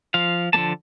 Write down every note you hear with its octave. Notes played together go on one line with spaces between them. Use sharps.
F3 F5
D3 F3 G3 A#3 A5